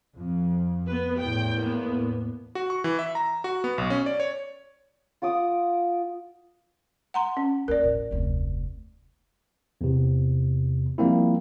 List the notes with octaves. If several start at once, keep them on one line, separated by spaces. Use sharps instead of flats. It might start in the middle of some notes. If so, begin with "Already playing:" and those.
F2
B3 B4
E2 A2 G5
A#3 B3
F#4
C#6
E3
E5
A#5
F#4
B3
B1
C#4
D5
C#5
F4 F#5 D6 D#6
F#5 A#5 C6
C#4
D#2 A#4 D5
A1
F1 D2
E2 C3
F3 G3 A#3 C4 E4